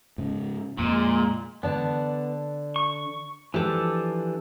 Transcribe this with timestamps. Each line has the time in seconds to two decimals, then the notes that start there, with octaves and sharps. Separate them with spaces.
0.18 G#2 C#3
0.78 F2 A#2 G#3 A#3
1.63 D3 B3 D5 A5
2.76 C#6
3.54 E3 F3 D4 G4 A4